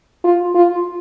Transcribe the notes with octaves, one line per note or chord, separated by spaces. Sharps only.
F4
F4